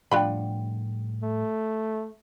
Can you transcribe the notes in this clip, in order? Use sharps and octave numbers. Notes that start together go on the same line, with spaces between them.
A2 F3 G3 D4 F4 F#5 G5 B5
A3